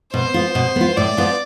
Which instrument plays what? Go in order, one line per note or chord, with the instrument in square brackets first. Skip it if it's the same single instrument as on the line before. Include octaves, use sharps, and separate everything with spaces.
[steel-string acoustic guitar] B2 [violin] C5
[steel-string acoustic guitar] B3 F4
B2
B3 F4
[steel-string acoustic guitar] A2 [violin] D5
[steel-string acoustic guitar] F3 B3 F4